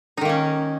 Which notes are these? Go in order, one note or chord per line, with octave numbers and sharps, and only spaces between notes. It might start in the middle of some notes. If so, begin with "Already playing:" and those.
D#3 A#3 C#4 D#4